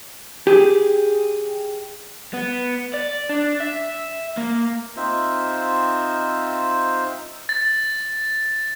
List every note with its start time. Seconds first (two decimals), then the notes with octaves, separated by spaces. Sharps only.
0.47 G4 G#4
2.34 B3
2.94 D5
3.29 D4
3.60 E5
4.37 A#3
4.97 C4 D#4 F4 C5 E5
7.49 A6